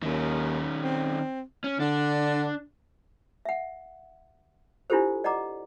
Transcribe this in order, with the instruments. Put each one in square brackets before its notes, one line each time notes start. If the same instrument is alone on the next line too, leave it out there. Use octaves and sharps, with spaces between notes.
[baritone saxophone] D#2 [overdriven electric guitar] D#3 C#4
[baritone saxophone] C4
[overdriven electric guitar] C#4
[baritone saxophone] D3 [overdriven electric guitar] D4
[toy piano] E5 F#5
D4 E4 F4 G4 A4 C5
D5 D#5 F#5 A#5 D6